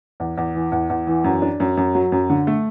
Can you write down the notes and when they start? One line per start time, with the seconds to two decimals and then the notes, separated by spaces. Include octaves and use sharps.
0.20 E2
0.37 E2
0.55 E3
0.72 E2
0.90 E2
1.07 E3
1.24 F#2
1.42 D4
1.60 F#2
1.77 F#2
1.95 F#3
2.12 F#2
2.30 D3
2.47 A3